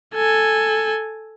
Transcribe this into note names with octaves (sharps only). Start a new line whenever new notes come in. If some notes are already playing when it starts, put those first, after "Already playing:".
A4 G#5